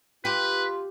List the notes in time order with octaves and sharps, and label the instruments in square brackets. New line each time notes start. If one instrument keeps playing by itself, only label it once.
[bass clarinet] F4 [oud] G4 [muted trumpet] B4